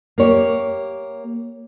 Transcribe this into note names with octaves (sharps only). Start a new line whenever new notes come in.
A#3 G4 C#5